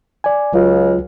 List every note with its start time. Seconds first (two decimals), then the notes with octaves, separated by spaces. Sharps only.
0.24 D5 G#5
0.53 C#2 F#3 F4